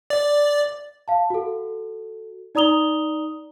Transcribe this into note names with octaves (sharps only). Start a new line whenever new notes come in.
D5
F5 A5
F#4 A4
D#4 D5 A#5 D#6 F7 G7